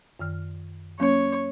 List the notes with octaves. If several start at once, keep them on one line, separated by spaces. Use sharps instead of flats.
F#2 D#3 F6
F#3 A#3 C#4 C#5